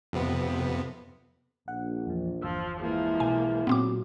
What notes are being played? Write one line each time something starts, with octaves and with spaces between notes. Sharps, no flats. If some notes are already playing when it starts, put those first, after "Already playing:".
F2 C3 B3
A#1 F#5
E2 F3
G1 E2 F3 E6
E3 F3 G#3 A#3 E4
B1 B2 G#5
A#1 A#2 F#3 B3 C4 D6